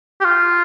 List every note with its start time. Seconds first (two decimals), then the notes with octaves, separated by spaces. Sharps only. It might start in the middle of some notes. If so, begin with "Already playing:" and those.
0.20 G4
0.25 F4